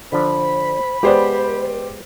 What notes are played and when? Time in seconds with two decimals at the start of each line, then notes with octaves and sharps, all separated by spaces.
0.12 D3 F3 D4 C5 B5
1.03 G#3 B3 G4 B4 C5 D5